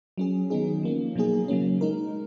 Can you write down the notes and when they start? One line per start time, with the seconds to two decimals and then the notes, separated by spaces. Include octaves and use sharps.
0.18 F#3 C#4 G#4
0.50 D#3 F#3 B3 D#4 G#4
0.83 F3 A#3 C#4
1.15 B2 F#3 A#3 D#4 G#4
1.48 C#3 F#3 A#3 C#4
1.81 G#3 D#4 A#4